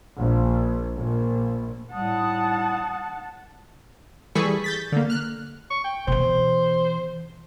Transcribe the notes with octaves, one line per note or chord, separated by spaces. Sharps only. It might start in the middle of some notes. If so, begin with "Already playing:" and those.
A#1
A#1
A2 G3 F#5 A5 D#6
E3 G3 G#4 A4 B5 C#6
G6 A6 B6
D3 A#3
F6 F#6
C#6
G5
B2 E3 C5